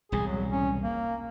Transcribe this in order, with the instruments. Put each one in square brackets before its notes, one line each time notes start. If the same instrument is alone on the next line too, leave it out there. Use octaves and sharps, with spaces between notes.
[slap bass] E1 C2 A2 [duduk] G#4
[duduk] F#3
C#4
A#3